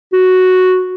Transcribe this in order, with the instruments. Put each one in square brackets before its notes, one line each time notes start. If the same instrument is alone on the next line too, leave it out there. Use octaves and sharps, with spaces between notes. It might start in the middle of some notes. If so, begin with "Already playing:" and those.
[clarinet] F#4